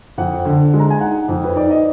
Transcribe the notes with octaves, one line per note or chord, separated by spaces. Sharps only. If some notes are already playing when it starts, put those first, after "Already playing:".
F2 F#5
D3
G#3
A#5
G#5
D#4 F#5
F2
B4
D#4 D5
D#5